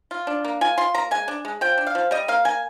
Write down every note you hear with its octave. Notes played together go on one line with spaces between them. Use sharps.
F4
D4
A#3
F4 G#5
F4 C6
A#3 A#5
G#3 G#5
D4
G#3
F3 G5
D4
F5
F3
G3 D#5
A#3 F5
A#3 G#5